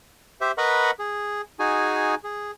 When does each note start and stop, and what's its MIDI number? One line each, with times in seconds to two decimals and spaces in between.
0.41 0.52 67
0.41 0.52 72
0.41 0.52 76
0.58 0.91 70
0.58 0.91 71
0.58 0.91 75
0.58 0.91 78
0.58 0.91 83
0.58 0.91 85
0.99 1.41 68
1.59 2.15 63
1.59 2.15 66
1.59 2.15 68
1.59 2.15 80
2.24 2.51 68